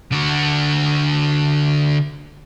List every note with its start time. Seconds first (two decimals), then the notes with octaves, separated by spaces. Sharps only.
0.12 D3 F#4